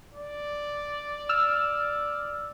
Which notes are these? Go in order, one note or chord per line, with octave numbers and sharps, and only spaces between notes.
D5
E6 F6